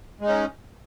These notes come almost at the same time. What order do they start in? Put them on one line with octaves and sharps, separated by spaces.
G#3 D#4 C#4